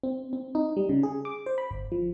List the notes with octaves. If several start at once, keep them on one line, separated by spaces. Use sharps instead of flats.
C4
C4
D#4
G3
C#3
G#4
D6
C5
B5
G1
F3